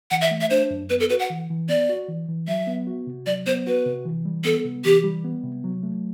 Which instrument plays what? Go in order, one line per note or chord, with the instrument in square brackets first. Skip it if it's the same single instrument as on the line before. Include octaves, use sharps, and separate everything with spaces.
[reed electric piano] E3 [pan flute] F#5
[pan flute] E5
[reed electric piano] A3
[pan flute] E5
[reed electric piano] D4 [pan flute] C5
[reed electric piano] F#2
[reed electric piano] B3 [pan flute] B4
[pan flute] A4
[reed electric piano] F#4 [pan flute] B4
[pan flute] F#5
[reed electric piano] E3
E3
[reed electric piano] B3 [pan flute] D5
[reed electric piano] F#4
E3
E3
[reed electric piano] F#3 [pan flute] E5
[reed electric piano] B3
F#4
C3
[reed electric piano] F#3 [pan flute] D5
[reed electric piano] B3 [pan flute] C5
[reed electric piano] F#4 [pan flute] B4
[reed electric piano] C3
E3
G3
[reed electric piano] B3 [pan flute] A4
[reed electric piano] C3
[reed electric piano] E3 [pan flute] G4
[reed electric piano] G3
B3
C3
F#3
A3